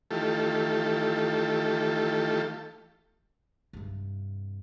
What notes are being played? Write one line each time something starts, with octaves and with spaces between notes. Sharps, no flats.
D#3 E3 A3 F4 G4 A4
G2 C3